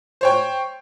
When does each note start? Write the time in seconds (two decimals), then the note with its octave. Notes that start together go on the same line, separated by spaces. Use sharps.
0.21 C5 C#5 G5